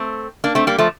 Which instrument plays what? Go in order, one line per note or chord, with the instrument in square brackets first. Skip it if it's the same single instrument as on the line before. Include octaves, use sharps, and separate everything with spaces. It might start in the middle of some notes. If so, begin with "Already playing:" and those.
Already playing: [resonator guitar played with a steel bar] A3 C4
A#3 D4
A3 C4
G3 A#3
F3 A3